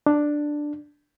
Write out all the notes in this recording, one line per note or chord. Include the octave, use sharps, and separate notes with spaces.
D4